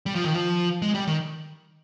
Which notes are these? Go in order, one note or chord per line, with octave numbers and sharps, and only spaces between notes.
G3
F3
D#3
F3
G#3
G3
D#3